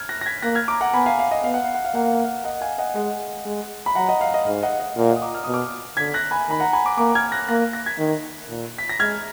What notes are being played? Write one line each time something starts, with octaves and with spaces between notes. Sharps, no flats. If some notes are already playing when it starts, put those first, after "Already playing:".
Already playing: F6 G#6
F#6 A#6
A#6
G#6 B6
A#3 F#6 A#6
F6 G#6
A#5 D6
F#5 A#5
B3 G#5 B5
F5 G#5
F5
D#5
B3 F5
F#5
F5
F#5
F5
A#3 F#5
F5
F#5
F5
D#5 F#5
F5 G#5
D#5 F#5
G#3 D#5 F#5
G#3
B5
F#3 F#5 A#5
D#5 F#5
F5
D#5
G#2 F5
D#5 F#5
D#5
A#2 F5
D#5 F#5
D#6
A#5 D6
F6
B2 D#6
D6 F6
D3 G#6 B6
F#6 A#6
G#5 B5
D#3 B5
F#5 A#5
G#5 B5
A#5 D6
A#3 A#5 D6
F6 G#6
F#6 A#6
A#3 F#6 A#6
F#6 A#6
G#6 B6
D#3
A#2
B6
A#6
G#3 F6 G#6